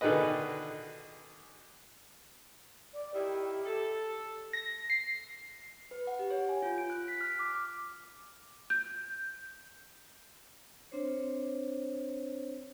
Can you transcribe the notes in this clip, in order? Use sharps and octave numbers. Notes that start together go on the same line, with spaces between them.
B2 D3 D#3 G#4 B4 D#5
D5
D#3 E4 G4
A4
A#6
C7
B4
F#5
G4
C#5
G#5
F4
D7
F#6
B6
F6
D6
D6
G6
C4 D4 C5 C#5